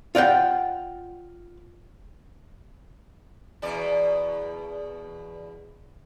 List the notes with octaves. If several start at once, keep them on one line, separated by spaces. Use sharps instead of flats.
F4 D5 F#5 G5
E2 B2 D5